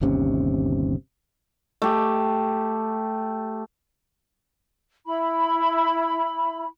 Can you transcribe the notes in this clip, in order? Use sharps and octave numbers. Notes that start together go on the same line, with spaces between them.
G1 D#2 C3 C#4
A3 G4
E4 B5